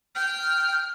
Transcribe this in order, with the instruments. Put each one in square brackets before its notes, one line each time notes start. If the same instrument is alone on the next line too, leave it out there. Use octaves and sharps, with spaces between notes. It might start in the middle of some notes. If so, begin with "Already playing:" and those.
[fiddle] G5 [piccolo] F6